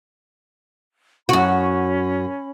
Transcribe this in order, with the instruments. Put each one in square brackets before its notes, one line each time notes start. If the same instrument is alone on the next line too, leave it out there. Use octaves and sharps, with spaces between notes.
[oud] F#2 F#4 [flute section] C#4 B5